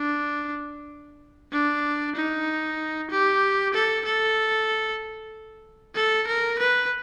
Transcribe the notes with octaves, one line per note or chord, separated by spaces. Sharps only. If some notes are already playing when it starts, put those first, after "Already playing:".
Already playing: D4
D4
D#4
G4
A4
A4
A4
A#4
B4